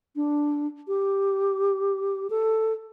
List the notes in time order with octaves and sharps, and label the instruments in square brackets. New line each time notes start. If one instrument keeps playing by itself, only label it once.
[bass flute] D4
G4
A4